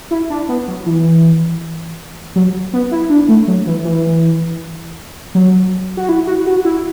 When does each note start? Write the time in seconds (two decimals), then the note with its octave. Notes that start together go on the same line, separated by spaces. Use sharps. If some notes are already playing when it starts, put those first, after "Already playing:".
0.11 E4
0.30 D4
0.49 B3
0.68 F#3
0.86 E3
2.36 F#3
2.73 B3
2.92 E4
3.10 D4
3.29 A3
3.47 F#3
3.67 E3
3.85 E3
5.35 F#3
5.97 F#4
6.09 E4
6.27 F#4
6.47 F#4
6.65 E4